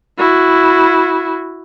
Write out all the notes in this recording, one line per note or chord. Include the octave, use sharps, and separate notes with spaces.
E4 F#4